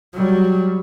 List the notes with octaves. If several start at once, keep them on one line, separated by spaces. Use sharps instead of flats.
F#3 G3